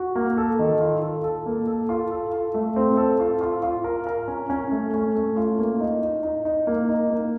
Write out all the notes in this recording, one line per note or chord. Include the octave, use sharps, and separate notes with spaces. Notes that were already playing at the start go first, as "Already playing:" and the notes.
Already playing: F#4
A#3
A4
D#3
F4
A4
A4
A#3
A4
F4
A4
F4
A3
C4
A4
F4
F4
F4
A#4
A#4
C#4
C#4
A3
C#4
A3
F4
A#3
D#4
D#4
D#4
D#4
A#3
D#4
A#3